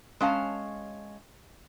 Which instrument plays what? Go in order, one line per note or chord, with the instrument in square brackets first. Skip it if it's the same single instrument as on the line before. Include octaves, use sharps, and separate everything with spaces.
[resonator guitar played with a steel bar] G#3 C#4 F5 A5